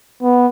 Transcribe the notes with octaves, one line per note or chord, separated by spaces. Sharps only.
B3